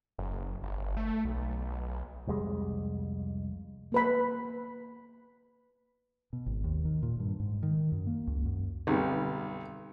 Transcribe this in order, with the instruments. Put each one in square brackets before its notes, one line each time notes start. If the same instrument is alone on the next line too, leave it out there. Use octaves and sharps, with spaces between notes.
[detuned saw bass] F#1
G1
A3
B1
[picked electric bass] C2 F2 G3 G#3
[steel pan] A#3 B4 B5
[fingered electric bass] B2
G#1
D#2
D#3
A#2
G2
G#2
D#3
F#2
A#3
C#2
F#2
[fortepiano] B1 G3 [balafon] D3 C4 D#4